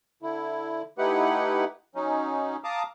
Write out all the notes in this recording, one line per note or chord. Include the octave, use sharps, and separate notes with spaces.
D3 E4
A3 D#4 E4 G4 B4 F#5
F#3 C#4 D#4
F5 A5 A#5 D6 D#6